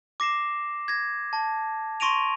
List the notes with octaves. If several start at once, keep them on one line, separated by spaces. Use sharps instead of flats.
D6 A#6 C7 E7
G#6 A#6
A5
C6 C#6 A#6 D7 D#7 F7